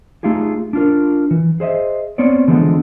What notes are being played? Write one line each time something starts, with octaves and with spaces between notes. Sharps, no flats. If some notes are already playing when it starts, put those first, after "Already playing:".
A3 D#4 F4 G4 G#4
D4 F4 A#4
E3
G#4 C5 D#5 E5
B3 C4 C#5 D5
D3 E3 F3 G#3 A3 B3